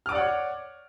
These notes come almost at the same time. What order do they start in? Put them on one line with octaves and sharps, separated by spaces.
F6 D6 D5 F#5 C#5